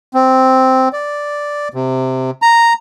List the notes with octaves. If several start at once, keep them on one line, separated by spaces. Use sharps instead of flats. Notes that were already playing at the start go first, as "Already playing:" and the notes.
C4
D5
C3
A#5